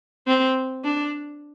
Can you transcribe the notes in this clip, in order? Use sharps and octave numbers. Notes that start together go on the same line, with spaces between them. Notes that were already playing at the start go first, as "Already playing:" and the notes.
C4
D4